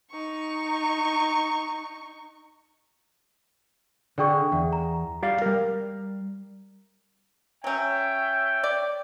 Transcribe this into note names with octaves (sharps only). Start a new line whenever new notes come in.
D#4 C#6
D3 G#4 D5 G5 C#6
E2
A#5
G3 D5 F5
G3 A#4
F#3 C#4 C#5 E5 G5
D5